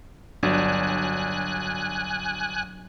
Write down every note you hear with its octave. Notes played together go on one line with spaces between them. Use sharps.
G1 F#3 D4 F#4 G#5 F#6